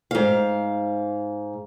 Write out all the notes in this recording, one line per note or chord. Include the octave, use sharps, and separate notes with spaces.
G#2 F5